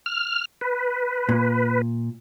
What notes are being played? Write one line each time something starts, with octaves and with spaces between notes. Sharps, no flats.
F6
B4
A#2